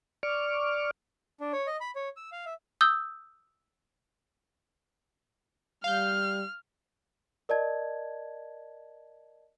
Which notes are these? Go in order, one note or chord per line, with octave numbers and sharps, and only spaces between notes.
D5 C#6 D6 F6
D4
C#5
D#5
B5
C#5
E6
F5
E5
D#6 E6 G6 G7
G3 F5 F6 G6
A#4 D5 D#5 A5 G#6